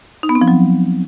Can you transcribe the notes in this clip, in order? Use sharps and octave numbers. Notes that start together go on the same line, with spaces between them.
D#4
B3
C4
F3
F#3